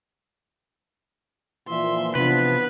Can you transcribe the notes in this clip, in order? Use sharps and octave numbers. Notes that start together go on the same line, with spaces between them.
A#2 E3 F3 E5 C6
C3 E3 F3 B3 D4 B4